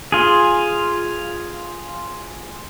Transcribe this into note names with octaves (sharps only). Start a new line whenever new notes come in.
F4 G#4